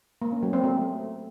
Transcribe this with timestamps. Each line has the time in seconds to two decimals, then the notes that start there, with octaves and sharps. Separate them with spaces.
0.22 A#3
0.32 C#4
0.43 F#3
0.53 C4
0.64 A3